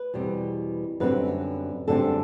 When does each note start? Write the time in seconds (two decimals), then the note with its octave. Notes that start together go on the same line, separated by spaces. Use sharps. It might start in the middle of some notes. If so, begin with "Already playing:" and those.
Already playing: B4
0.14 E2 B2 G3 C4
1.00 F#2 D3 G3 C4 B4
1.88 F#2 D3 G3 C4 A4